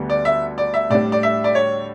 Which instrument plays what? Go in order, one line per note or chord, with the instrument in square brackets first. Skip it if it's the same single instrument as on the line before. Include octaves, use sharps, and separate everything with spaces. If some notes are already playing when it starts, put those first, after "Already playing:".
Already playing: [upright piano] D2 D3 G3 B3
[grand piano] D5
E5
D5
E5
[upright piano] A2 G3 D4 [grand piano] D5
[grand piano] D5
E5
D5
C#5